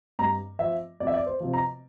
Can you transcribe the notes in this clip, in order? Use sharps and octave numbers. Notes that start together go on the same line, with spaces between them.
G2 A#5
F3 E5
F2 D5
E5
D5
C5
C3 F3
A#5